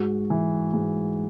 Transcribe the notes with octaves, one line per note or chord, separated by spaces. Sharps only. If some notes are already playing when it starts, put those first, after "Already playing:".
Already playing: G#2 F#4
E3
G#2